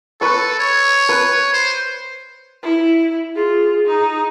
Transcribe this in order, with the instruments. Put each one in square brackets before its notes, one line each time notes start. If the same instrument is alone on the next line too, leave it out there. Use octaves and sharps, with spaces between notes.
[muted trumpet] A4 [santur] B4 C#6
[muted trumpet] C#5
[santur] B4
[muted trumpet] C5
[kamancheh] E4
[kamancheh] F4 [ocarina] G#4
[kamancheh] D#4